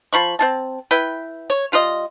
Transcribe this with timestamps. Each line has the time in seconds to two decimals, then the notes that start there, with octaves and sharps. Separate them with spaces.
0.13 F3 B5 C#6
0.39 C4 F4 A5
0.91 E4 B4 G5
1.50 C#5
1.72 G3 F4 B4 D#5